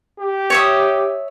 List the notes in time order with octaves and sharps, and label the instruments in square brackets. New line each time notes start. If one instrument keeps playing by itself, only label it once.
[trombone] G4
[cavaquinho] C#5 E5 D#6